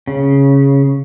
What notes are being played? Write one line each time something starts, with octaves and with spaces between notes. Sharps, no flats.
C#3